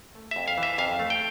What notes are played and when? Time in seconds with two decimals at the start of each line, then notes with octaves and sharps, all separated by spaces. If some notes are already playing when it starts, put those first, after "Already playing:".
0.15 A3
0.31 F2 E5
0.48 F5
0.58 E3
0.63 E5
0.78 F2 F5
0.99 A3
1.10 G5